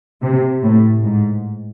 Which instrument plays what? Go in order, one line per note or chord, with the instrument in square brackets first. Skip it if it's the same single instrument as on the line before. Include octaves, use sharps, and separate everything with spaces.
[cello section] C3
A2
G#2